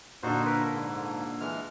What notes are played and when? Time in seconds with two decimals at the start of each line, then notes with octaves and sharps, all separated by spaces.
0.23 A#2 D3 D#4 F#4 C5
0.45 A#4 B4
0.72 G#2
1.40 E3 G#3 F6